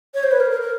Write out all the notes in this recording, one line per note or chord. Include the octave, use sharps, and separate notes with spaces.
C#5
C5
B4
A#4
A#4
A#4